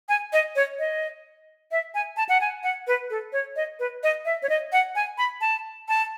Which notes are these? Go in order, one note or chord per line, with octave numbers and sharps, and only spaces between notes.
G#5
D#5
C#5
D#5
E5
G#5
A5
F#5
G#5
F#5
B4
A4
C#5
D#5
B4
D#5
E5
C#5
D#5
F#5
G#5
B5
A5
A5